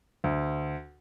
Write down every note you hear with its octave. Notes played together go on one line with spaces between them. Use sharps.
D2